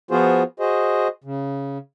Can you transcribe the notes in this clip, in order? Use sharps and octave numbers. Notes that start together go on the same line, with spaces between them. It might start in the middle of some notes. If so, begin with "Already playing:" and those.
F3 B3 F4 F#4 G#4 C5
F#4 G#4 C5 D#5
C#3